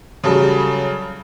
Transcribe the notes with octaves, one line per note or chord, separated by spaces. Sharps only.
C#3 F#3 G3 A4